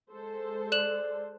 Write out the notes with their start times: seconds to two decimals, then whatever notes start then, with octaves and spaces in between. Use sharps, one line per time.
0.12 G#3 A4 C5
0.72 D5 F#6 E7 F#7